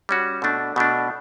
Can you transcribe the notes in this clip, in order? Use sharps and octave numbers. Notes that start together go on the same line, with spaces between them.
G3 C#4 F#4
B2 A3 D4
B2 A3 D4